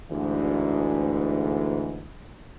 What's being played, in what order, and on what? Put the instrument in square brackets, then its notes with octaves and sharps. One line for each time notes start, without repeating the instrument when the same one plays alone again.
[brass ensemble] D2 G#2 E3